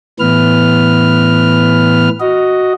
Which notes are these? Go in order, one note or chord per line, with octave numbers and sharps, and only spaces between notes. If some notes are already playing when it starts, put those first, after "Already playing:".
A2 E3 B3 B4 F6
F#4 D#5